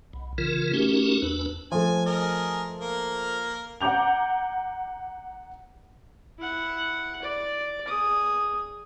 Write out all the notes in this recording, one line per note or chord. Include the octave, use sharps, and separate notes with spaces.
B1
C#3 E3 F4 A#4
A3 C#4 D#4 F#4 G4 A#4
E2 D4 B4
F3 A3 G#5
G#4 A#4 D#5
A#3 A#4
F#5 A#5 D6 G6 F7
E4 F#5
D5
G#4 D#6